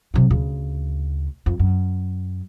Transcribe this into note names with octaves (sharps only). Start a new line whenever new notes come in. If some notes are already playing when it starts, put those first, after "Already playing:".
C3 F#3
D2 C#3
F2
F#2